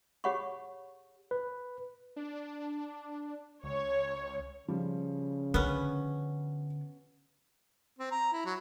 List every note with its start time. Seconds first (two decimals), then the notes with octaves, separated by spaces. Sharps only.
0.24 G4 G#4 C#5 F#5 B5 C#6
1.31 B4
2.16 D4
3.63 C#2 C#5
4.68 C#3 F3 G3
5.54 D3 B3 C#4
7.99 C4
8.12 A#5
8.33 E4
8.46 F#3